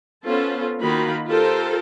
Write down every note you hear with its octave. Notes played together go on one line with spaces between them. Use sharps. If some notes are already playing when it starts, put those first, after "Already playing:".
B3 C#4 F4 A4 C5
D#3 A#3 D#4 F4 F#4 B5
F4 G4 A4 A#4 C5